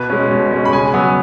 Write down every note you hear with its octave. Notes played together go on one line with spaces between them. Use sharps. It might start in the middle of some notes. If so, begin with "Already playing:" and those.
Already playing: B2 B4
G#3 C#4
B2
G#3 C#4
B5
C#3 G#5
F#3 B3